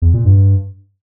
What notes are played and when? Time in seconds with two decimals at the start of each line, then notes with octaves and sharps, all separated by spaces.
0.02 E2
0.13 A#2
0.25 G2